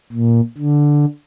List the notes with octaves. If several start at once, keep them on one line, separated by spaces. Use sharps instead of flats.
A#2
D3